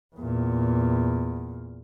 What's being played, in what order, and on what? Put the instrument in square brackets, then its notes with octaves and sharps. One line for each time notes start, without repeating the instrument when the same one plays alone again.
[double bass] E2 A#2